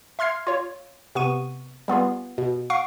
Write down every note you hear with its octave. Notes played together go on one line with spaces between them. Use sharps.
E5 C6 F6 G#6 C7
F4 C#5
C3 B3 C#6 D#7
G3 B3 F4 G#4
B2
F5 F#5 C#6 C7 D7